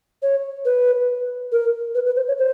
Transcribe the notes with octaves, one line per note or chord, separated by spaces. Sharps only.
C#5
B4
A#4
B4
B4
C5
C#5
C5